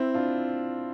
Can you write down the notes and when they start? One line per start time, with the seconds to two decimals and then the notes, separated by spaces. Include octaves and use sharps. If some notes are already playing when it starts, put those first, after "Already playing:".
Already playing: C4 E4
0.14 D4 F4